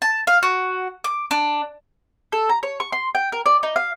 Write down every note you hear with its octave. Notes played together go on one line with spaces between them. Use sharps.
A5
F5
F#4
D6
D4
A4
A#5
C#5
C#6
C6
G5
A#4
D5
D#4
F5